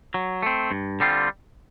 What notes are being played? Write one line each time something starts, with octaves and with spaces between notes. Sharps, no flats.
F#3
A3 C4
G2
D3 G3 C4 F4